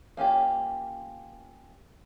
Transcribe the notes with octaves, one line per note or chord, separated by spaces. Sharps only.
A#3 C#4 F4 G4